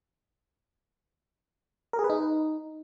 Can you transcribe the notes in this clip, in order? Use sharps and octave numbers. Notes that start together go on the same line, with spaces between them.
A#4
G#4
B4
D#4